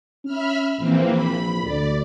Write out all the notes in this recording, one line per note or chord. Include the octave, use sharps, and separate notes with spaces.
C#4 E5 B5 F6
A#1 E3 A#3 C4
B5
D2 D5